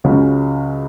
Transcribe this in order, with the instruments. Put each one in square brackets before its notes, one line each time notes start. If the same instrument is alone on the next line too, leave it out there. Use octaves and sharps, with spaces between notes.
[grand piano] C#2 C#3 F#3 C#4